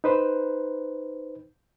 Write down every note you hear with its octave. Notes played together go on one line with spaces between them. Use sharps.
D#4 B4 C5